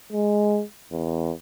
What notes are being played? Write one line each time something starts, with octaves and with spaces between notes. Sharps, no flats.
G#3
E2